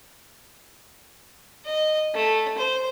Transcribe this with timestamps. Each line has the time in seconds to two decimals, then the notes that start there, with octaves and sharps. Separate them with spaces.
1.65 D#5
2.15 A3
2.58 C5